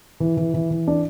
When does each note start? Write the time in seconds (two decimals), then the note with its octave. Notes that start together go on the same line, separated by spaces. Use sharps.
0.20 E3
0.37 E3
0.54 E3
0.71 E3
0.87 D4